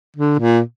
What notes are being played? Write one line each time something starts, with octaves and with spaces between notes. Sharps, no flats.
D3
A#2